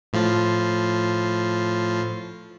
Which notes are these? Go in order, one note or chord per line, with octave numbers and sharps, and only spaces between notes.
A2 F3 F4